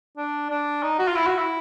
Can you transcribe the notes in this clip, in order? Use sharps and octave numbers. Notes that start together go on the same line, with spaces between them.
D4
D4
D#4
F#4
F4
E4
F#4
E4